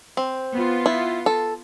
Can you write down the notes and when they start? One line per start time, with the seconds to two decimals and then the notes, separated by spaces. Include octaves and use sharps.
0.17 C4
0.52 B3 F4
0.86 E4
1.26 A4